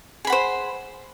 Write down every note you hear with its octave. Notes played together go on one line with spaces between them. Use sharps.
G#4 C5 F#5 B5